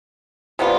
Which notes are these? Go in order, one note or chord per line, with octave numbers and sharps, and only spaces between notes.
C3 G3 B3 F4